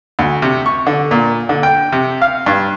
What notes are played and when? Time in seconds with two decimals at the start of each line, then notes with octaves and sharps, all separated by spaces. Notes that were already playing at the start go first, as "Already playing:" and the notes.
0.19 D2
0.42 C3
0.66 C#6
0.87 D3
1.11 A#2
1.49 D3
1.63 G5
1.92 C3
2.22 F5
2.46 G2